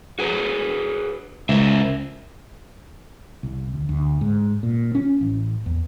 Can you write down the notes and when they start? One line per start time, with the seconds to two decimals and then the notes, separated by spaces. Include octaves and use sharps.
0.19 F#4 G#4 B4
1.49 C#2 A#4 C5 E5
3.43 C2
3.74 D2
3.89 D2
4.21 G#2
4.63 A#2
4.95 C#4
5.21 A1
5.66 E2